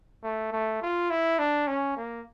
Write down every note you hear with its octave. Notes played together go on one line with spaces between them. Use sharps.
A3
A3
F4
E4
D4
C#4
A#3